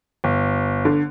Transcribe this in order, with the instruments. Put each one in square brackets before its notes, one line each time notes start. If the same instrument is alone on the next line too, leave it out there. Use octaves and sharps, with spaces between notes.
[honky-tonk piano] G1
D3